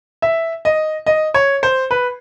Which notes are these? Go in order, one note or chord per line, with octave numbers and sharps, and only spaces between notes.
E5
D#5
D#5
C#5
C5
B4